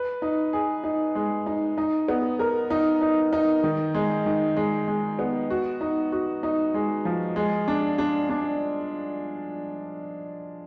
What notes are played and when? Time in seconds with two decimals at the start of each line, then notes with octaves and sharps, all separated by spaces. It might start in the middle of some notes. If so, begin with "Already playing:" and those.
Already playing: B4
0.22 D#4
0.53 G#4
0.84 D#4
1.15 G#3
1.46 D#4
1.78 D#4
2.08 B3
2.39 A#4
2.70 D#4
3.01 D#4
3.33 D#4
3.63 D#3
3.95 G#3
4.26 D#3
4.57 G#3
4.88 G#3
5.19 B3
5.50 F#4
5.81 D#4
6.12 F#4
6.43 D#4
6.74 G#3
7.05 F3
7.36 G#3
7.68 D4
7.98 D4
8.30 D4